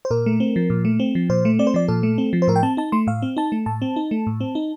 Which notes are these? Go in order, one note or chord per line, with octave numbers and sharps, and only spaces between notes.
C5
A#2 A#4
A3
C4
F3
A#2
A3
C4
F3
A#2 C5
A3
C4 D5
C5
F3 D5
A#2 A4
A3
C4
F3
C5
A2 A#4
G5
C4 A5
D#4 A5
A3 C6
A2 F5
C4
D#4 A5
A3
A2 A5
C4
D#4
A3
A2
C4
D#4